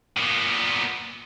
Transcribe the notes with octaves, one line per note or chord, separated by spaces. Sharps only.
A#2 B3